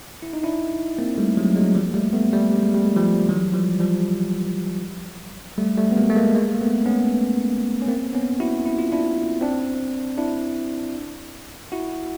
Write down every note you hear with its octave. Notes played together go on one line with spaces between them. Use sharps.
E4
D#4
D4 E4
A#3 C4
G3 A3
F#3 G#3
F#3 G#3
F3 G3
A#3
G3 A3
A3 B3
G3 A3
G3
G#3
G3
G#3
F3 G3
E3 F#3
F3 G3
F3 G3
G3 A3
G3 A3
B3
G#3 A#3
A3
G#3 A#3
G#3 A#3
A#3
A3 B3
B3 C#4
C#4
A#3 C4
B3 C#4
E4 F#4
E4
F4
D4 E4
C4 D4
D4 E4
E4 F#4